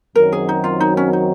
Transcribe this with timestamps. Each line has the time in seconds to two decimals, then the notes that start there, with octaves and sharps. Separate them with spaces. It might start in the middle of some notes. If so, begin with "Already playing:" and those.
0.15 F#2 D#3 F#3 C4 A#4
0.32 G#4
0.49 D#4
0.64 F4
0.80 D#4
0.97 C#4
1.13 D#4